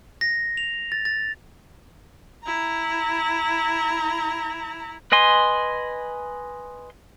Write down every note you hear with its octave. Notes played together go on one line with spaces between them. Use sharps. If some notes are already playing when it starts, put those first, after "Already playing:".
A#6
F7
A6
A6
E4 A#5
B4 D#5 G#5 C6